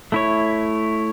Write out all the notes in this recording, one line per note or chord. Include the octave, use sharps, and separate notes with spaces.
A3 E4 C#5